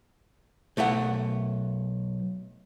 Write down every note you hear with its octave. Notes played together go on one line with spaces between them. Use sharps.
B1 A3 E5 F#5